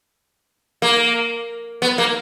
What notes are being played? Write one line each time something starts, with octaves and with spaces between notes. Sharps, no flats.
A#3
B3
A#3